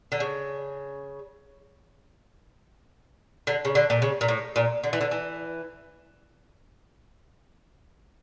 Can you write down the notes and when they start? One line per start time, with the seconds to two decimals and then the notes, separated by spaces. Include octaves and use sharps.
0.12 D3
0.20 C#3
3.47 D3
3.65 C#3
3.75 D3
3.90 A#2
4.02 C#3
4.21 A#2
4.28 A2
4.56 A#2
4.84 D3
4.93 E3
5.01 D3
5.11 E3